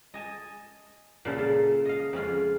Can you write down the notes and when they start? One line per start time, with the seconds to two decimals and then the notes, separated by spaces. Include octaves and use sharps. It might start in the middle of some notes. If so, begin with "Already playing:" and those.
0.14 D#5 G#5 A5
1.25 A#2 C#3 A4
1.38 F4 A4 F5
1.85 D#5 F5
2.13 F2 G#3 C#4 F4